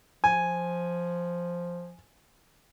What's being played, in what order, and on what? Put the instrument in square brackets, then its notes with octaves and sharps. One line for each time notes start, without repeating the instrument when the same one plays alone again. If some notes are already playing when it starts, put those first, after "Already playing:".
[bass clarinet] F3 [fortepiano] G#5